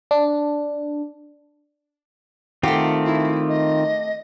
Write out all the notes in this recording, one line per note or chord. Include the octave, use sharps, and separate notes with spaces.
D4
D#3 A3 C4 F4 G4 F#5
E4
D#5